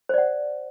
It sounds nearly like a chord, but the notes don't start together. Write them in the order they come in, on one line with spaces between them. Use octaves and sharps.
C5 D5 F#5